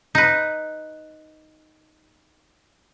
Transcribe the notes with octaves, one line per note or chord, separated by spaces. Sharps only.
D#4 B4